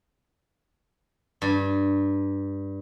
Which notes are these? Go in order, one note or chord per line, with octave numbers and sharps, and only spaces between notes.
G2